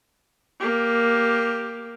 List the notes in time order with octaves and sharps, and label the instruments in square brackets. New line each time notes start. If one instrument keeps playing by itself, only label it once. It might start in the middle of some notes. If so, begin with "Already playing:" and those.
[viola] A#3 G4